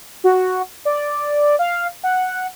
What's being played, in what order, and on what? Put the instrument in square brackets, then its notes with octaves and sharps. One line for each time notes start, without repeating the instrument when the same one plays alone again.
[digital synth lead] F#4
D5
F5
F#5